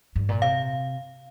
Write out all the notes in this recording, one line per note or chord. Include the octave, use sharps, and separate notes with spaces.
G2
A#2
C3 F5